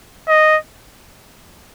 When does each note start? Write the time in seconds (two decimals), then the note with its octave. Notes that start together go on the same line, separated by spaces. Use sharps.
0.28 D#5